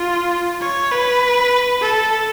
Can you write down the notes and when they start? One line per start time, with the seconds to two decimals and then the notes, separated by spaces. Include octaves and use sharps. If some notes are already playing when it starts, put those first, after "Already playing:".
Already playing: F4
0.61 C#5
0.91 B4
1.81 A4